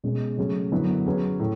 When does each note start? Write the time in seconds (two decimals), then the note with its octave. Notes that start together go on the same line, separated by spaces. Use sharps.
0.04 B2 G#3 C#4
0.37 C#3 F#3 A3 C#4 G#4
0.71 F#2 D3 F#3 B3 E4
1.06 F#3 C#4 G#4 B4
1.40 A2